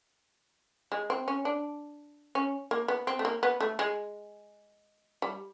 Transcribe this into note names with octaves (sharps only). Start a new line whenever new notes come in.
G#3
C4
C#4
D4
C#4
A#3
B3
C4
A3
A#3
B3
A3
G#3
G3